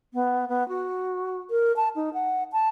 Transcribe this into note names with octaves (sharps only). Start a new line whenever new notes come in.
B3
B3
F#4
A#4
A5
D#4
F#5
A5